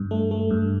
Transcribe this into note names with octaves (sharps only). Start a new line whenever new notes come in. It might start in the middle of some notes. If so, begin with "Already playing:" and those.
Already playing: G2
A3
A3
G2